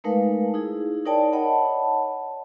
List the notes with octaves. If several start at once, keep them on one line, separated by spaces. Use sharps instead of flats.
G#3 A3 D#4 A#4 B4 F5
D#4 E4 G#4
D#4 A#4 C#5 D5 G5 A5
C#5 D#5 F#5 A5 B5